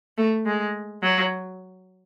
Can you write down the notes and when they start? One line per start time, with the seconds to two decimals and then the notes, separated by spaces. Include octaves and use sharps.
0.17 A3
0.46 G#3
1.03 F#3